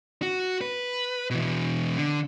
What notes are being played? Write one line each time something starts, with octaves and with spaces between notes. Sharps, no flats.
F#4
B4
B2 E3
D3